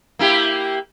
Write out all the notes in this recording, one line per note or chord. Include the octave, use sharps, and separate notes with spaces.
A#3 E4 G4